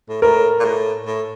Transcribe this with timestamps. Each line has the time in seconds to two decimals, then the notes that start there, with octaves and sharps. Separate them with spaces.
0.09 A2
0.22 A2 A#4
0.59 A#2
0.65 A2
1.06 A2